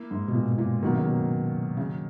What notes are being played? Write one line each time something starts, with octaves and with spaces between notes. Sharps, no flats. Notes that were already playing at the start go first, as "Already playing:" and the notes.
Already playing: A#3 E4
G#2
B2
A#2
A#2
B2 D#3 F#3 A#3
C#3
B2
C#3